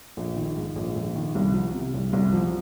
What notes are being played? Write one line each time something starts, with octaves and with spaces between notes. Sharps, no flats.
A#1
D#3
G#2
A#1
A#1
D#3
C2
F3
C3
C2
C2
F3